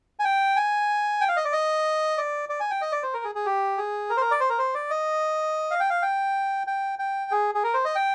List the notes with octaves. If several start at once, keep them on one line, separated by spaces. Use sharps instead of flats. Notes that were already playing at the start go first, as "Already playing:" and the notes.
G#5
G5
G#5
G5
F5
D#5
D5
D#5
D5
D5
G#5
G5
D#5
D5
C5
A#4
G#4
G#4
G4
G#4
A#4
C5
A#4
D5
C5
A#4
C5
D5
D#5
F5
G5
F5
G5
G5
G5
G#4
G#4
A#4
C5
D#5
G5